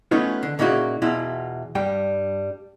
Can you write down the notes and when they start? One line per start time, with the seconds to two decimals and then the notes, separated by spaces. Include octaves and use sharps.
0.11 E3 A3 B3 C#4 D#4 F4
0.43 D3
0.59 A#2 C#3 A#3 D#4 E4 F#4
1.02 E2 B2 E4 F4
1.75 G2 G3 G5